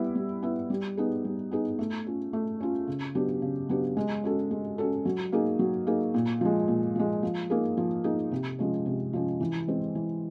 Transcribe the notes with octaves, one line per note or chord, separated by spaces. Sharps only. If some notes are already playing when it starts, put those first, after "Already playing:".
Already playing: G3 B3 E4
G3
B3 E4
G3
B3 D#4 G#4
G3
B3 D#4 G#4
A3
C#4 F4
A3
C#4 F4
C#3
F#3 B3 D4 G4
C#3
F#3 B3 D4 G4
G#3
C#4 F#4 A4
G#3
C#4 F#4 A4
F#3
A#3 D#4 G#4
F#3
A#3 D#4 G#4
A#2
F3 G#3
A#2
F3 G#3
F3
A#3 D#4 G#4
F3
A#3 D#4 G#4
C3
F3 G#3 C#4
C3
F3 G#3 C#4
E3
G#3 C4
E3